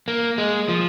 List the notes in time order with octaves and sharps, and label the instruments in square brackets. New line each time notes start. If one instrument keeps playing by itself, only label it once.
[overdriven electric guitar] A#3
G#3
F3